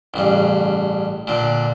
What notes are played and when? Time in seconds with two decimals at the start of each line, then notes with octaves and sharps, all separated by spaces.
0.14 A1 G2 C#3
1.27 A#2 D3